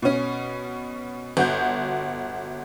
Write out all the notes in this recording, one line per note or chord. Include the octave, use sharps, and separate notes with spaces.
B2 C#4
G1 F#4 G6